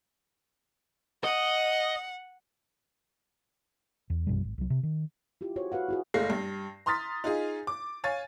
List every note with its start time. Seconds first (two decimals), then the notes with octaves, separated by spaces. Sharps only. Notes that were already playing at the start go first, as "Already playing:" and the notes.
1.24 D#5 F#5
4.10 E2
4.27 A#1 F#2 B2 G3
4.44 G#1
4.58 C2 F#3
4.70 C3
4.83 D#3
5.41 E4 F4 G4
5.56 F#4 G#4 C5 C#5
5.72 F#4 B4 F5 F#5
5.89 E4 F#4 G#4
6.14 F#1 G#3 A3 F5 A#6 C7
6.30 G2
6.86 A#5 C6 D#6 F6 A6 B6
7.24 D#4 F4 G#4
7.67 D6
8.04 C#5 F5 G#5 A6